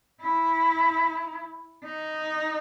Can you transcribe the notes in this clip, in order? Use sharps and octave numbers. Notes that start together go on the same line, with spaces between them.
E4
D#4